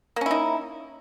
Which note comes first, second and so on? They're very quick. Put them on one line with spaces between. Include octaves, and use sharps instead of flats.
A#3 C#4 E4 D#4